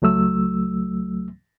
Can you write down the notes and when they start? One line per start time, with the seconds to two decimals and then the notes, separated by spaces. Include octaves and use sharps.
0.02 C#2 F#3 A3 E6